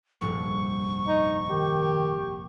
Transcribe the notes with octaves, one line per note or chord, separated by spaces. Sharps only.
F1 A#1 G2 C#6
D#4
D#3 G4